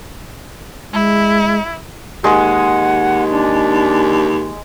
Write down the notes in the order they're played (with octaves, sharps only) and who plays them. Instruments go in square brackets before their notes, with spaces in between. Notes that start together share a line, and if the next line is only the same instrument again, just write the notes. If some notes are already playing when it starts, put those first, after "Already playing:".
[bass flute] G#3 [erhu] E4
[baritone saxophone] D#2 [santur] G#3 [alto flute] F#5
[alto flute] D4